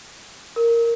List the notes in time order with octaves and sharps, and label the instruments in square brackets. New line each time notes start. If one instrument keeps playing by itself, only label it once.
[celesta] A#4